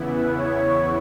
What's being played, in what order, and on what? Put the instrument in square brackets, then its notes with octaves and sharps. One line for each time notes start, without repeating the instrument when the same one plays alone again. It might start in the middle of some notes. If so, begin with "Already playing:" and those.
Already playing: [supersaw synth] E2 C#3 E3 B3 E4
[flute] B4
C#5